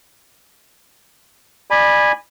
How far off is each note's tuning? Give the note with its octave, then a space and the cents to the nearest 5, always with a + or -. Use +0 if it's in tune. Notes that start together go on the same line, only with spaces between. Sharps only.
D5 +30 G#5 -15 B5 -10